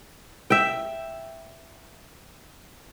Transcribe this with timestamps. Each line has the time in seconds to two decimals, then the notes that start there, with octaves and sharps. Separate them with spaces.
0.50 E5 G5